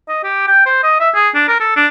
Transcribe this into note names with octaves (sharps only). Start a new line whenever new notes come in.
D#5
G4
G5
C5
D#5
E5
G#4
D4
A#4
A4
D4